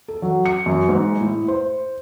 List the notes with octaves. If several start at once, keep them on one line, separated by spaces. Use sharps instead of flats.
A4
F#3
C#7
F#2
G#2
A2
C5